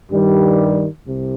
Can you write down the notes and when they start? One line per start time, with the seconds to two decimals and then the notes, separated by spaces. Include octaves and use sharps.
0.10 G2 D#3 G3
1.05 C2 C3